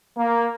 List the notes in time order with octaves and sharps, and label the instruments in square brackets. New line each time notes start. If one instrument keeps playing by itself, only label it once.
[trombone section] A#3